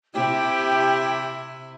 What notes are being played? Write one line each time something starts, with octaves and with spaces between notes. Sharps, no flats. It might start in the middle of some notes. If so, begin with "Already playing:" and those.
C3 E4 G4